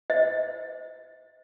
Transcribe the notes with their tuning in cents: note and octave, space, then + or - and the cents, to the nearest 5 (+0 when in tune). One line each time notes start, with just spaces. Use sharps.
C5 -30 D#5 +35